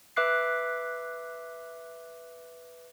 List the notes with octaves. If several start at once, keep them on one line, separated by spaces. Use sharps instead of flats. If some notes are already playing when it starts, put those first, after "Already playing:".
B4 E5 D6 F#6 C7